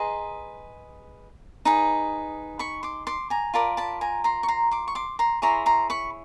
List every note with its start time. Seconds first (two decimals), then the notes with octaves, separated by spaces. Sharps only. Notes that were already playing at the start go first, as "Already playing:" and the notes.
Already playing: G#4 B4 D#5 A#5 C6
1.65 D#4 G#4 B4
2.59 B5 C#6
2.83 C6 D6
3.07 C6 D6
3.30 G#5 A#5
3.54 F4 A#4 D5 A5 B5
3.77 A5 B5
4.01 G#5 A#5
4.24 A#5 C6
4.43 C#6
4.48 A#5 C6
4.71 C6 D6
4.88 C#6
4.95 C6 D6
5.19 A#5 C6
5.42 E4 G#4 C#5 A#5 C6
5.66 A#5 C6
5.90 B5 C#6